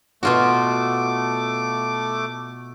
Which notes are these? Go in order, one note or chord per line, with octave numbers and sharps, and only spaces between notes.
B2 A3 F4 F#4 D6